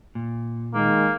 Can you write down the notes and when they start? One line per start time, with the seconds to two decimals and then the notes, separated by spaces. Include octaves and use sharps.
0.15 A#2
0.74 D#3 G#3 A#3